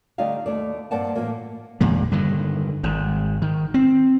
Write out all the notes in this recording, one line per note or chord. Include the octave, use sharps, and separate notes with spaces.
D3 G3 A3 D4 D#4 F5
D#2 A#2 A3 D5
G2 A#3 C5 D5 F#5 A5
A2 E3 A#3
G1 E2 A#2 G#3
G2 D3 D#3
G#1 G#2
D#3
C4